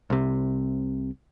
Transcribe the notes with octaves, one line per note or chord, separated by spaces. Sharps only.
C2 C3